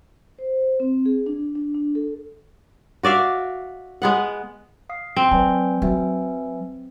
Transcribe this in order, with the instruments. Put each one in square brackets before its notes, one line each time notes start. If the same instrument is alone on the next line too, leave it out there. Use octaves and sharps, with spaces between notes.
[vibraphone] C5
C4
G#4
D4
D4
D4
A4
[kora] F#4 D5 E5 F5
G#3 B3 F#5
[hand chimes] F5 D#6 C7
[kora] C4
[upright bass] F#3 [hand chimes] B4 D5 G#5
[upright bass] F#3 [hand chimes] B4 E5 G#5